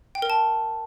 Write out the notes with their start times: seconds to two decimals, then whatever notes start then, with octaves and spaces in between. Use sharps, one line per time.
0.15 G5
0.22 A#4
0.30 A5